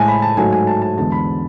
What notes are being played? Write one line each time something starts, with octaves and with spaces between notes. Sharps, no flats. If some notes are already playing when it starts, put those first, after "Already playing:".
Already playing: A2 G#3 G#5 A5
B5
A5
G#2 F#3 A3 G#5
G#5
A5
A5
E2 D3 G#3 A5
B5